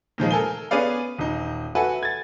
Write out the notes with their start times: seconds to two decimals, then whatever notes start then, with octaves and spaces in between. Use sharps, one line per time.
0.18 A#2 D#3 F3 G#3
0.31 A4 A#4 G#5 G7
0.71 B3 C#4 G#4 B4 D5 F5
1.18 D#1 D#4
1.75 F#4 A4 B4 E5 F#5 G#5
2.03 G#6 A6